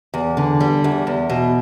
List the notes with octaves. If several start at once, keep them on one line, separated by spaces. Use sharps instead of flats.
E2
D3
G3
E2
E2
B2